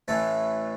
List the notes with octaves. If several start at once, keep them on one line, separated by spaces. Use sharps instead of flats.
A1 A2 E3 A3 A4